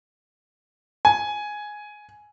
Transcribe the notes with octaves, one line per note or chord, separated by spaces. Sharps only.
G#5